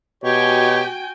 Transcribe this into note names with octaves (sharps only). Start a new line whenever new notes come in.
B2 F#4 G4 C#5 G5 G#5